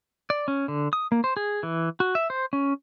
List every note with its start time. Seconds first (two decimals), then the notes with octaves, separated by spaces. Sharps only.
0.30 D5
0.48 C#4
0.68 D3
0.93 D#6
1.12 A#3
1.24 C5
1.37 G#4
1.63 E3
2.00 F#4
2.15 E5
2.30 C5
2.53 C#4